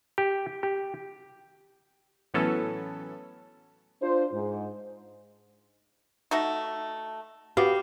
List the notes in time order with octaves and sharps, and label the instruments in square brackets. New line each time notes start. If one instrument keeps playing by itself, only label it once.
[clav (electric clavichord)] G4
G4
[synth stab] A2 E3 F#3 B3 C#4 A4
[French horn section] D4 F4 C5
G#2
[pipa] A3 D#4 F#4
[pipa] B3 [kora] F#4 G4 F5